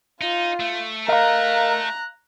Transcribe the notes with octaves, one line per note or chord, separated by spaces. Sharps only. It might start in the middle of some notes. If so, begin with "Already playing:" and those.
D#4 F4
A3
A#4 D#5 F5 A#5 F#6